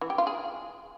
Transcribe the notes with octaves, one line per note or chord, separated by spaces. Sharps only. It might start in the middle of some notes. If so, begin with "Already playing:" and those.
E3
G4
F4
G#4